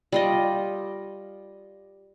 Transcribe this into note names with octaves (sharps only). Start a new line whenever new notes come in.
G3 F4 D#5